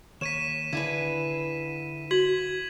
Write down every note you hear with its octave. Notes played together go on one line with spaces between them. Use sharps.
D#2 C#5 B6 D#7 E7
D3 E4 G#4 B4
F#4 G#6 B6 F#7